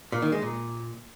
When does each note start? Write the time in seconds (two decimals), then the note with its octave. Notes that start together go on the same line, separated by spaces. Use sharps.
0.12 A#2
0.22 D#3
0.32 G#3
0.42 A#2